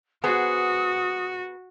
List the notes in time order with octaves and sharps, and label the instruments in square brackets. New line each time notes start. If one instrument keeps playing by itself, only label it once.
[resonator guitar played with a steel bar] B3 G#4 C5 [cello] F#4 [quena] D#6